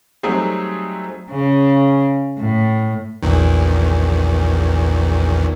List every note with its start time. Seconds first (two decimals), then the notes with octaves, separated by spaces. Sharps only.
0.23 F#3 G3 A3 C4 D#4 G#4
1.31 C#3
2.39 A2
3.23 A#1 E2 D#3